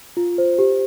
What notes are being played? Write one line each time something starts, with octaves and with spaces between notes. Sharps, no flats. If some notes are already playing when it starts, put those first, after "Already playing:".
F4
C5
G4